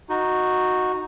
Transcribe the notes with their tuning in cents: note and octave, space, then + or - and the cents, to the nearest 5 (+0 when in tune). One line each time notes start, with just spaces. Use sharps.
D#4 +0 F#4 -10